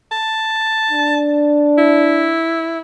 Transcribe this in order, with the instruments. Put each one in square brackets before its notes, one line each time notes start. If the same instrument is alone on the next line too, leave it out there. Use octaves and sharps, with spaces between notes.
[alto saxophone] A5
[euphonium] D4
[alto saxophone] E4